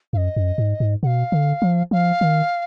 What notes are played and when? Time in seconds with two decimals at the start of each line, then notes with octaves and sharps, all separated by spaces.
0.13 F#2 F5
0.17 D#5
0.36 F#2
0.58 G#2
0.80 G#2
1.03 B2 F#5
1.07 F5
1.32 D3
1.62 F3
1.91 F3 F5
2.21 D#3